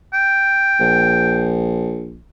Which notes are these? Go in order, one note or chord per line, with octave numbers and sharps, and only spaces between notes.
G5
A#1